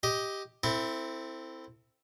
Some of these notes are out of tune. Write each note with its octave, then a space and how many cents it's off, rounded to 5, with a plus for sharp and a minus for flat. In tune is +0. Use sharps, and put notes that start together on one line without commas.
G4 +0 D#5 +10
C4 -5 E4 +0 A4 +30